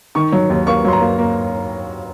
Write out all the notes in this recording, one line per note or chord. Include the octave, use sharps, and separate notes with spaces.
D#3 C#6
F#3
D#2
A#3 C#6
F#3 C6
A#5
A#3
A#3